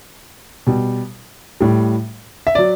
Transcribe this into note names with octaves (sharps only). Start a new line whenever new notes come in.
B2 G3
A2 G3
E5
F#3 D5